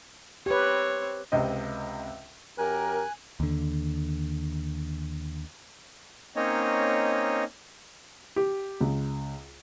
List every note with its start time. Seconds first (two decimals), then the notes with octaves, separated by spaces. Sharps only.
0.46 C4 G4 B4 C#5
1.32 C#2 C3 C4 D#5
2.58 F#2 G4 A#4 G#5 F#6
3.40 D#2 D3
6.36 A#3 C4 C#4 D#4 C#5 D#5
8.36 G4
8.81 C#2